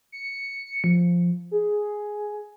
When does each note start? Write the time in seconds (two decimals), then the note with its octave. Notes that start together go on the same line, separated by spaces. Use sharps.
0.12 C#7
0.84 F3
1.51 G#4